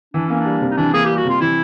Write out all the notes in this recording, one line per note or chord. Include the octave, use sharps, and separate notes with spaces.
E3 D4
A#3 C#4
D4
G3
C3
D#4
E3 D4
A#3 G#4
G3 G4
F#4
C3 F4
E3 E4